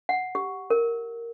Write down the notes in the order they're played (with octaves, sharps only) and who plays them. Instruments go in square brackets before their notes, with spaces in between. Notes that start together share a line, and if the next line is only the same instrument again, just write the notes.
[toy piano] F#5
G4
A#4